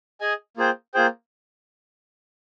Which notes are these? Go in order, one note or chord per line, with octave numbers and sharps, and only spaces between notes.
G#4 D#5 G#5
A#3 F4 G#4 C5 G5
A#3 F4 G#4 C5 G5